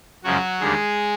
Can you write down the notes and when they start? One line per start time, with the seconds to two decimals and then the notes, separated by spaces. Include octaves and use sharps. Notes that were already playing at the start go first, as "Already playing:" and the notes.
0.24 F#2 C#3 F3 F#3 G#3 F#4
0.61 D#2 D3 G3 G#3 G#4